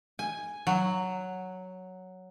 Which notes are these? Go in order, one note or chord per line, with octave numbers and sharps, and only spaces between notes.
G#5
F#3